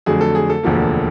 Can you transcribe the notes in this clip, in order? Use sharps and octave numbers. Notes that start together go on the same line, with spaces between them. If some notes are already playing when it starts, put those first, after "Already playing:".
F2 D3 F#3 A3 G#4
A4
G#4
A4
E1 D2 D3 F3 A#3